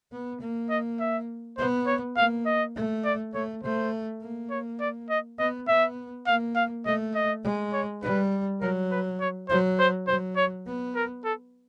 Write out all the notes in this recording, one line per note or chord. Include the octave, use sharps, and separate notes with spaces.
B3
A#3
D#5
E5
B3 C5
C#5
A#3 F5
D#5
A3
D5
A3 C#5
A3 C5
A#3
C#5
D5
D#5
B3 D#5
B3 E5
A#3 F5
F5
A3 D#5
D#5
G#3
C#5
G3 B4
F#3 A#4
B4
C#5
F#3 C5
C5
F#3 C5
C#5
B3
A#4
A4